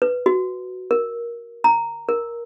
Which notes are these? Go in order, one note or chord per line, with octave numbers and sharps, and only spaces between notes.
B4
F#4
A#4
A#5
A#4